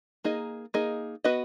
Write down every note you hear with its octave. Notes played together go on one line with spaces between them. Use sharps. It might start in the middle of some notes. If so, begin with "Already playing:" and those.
A#3 D#4 G#4 D#5
A#3 D#4 G#4 D#5
B3 F#4 B4 D#5